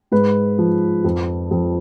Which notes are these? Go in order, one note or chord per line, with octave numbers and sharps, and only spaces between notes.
G#2 B4
F3
F2
F2